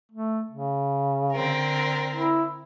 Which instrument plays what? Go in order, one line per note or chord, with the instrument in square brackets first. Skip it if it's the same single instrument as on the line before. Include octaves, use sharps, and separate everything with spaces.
[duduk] A3
C#3
[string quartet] D3 C4 A#4
[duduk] E4